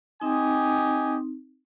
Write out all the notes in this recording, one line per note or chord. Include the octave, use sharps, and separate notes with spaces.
C4 D#4 G4 D#5 G#5